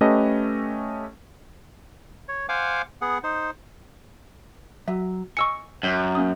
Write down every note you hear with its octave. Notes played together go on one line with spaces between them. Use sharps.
A3 C#4 G4 A4 B4 D#5
C#5
C5 F5 F#5 G#5 D6
B3 G#4 F#5
D#4 C5
F#3 E5
D#5 G#5 C#6 E6 C#7
F#2
A#3 C#4 D#6